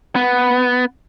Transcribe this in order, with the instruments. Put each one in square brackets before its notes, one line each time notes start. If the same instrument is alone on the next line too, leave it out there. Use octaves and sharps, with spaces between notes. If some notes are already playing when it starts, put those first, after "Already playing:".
[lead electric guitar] B3